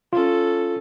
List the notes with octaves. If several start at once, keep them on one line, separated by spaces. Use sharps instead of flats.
C#4 F4 A4